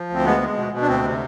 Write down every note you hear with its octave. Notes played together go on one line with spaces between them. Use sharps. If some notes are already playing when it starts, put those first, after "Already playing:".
Already playing: F3
D2 C4
G#3 B3
G#3
B2
B2
D4
D2 C4
C3